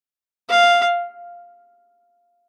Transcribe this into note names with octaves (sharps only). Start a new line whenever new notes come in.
F5